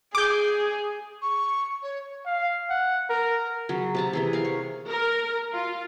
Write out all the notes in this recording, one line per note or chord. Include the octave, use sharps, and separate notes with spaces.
G#4 D6 G6
C#6
C#5
F5
F#5
A#4
C#3 F#3
C3 A5 A#5
C3 E3 G#4
A#4 F5
C#5
A#4
F4